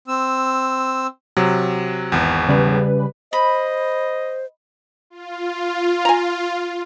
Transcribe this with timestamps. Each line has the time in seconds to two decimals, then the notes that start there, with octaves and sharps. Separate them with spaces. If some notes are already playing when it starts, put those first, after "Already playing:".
0.08 C4 E6
1.37 C3 F#3
2.12 G#1 E2
2.49 C#3 G3 B4
3.33 C5 D#5 B5
5.10 F4
6.05 G#5 A#5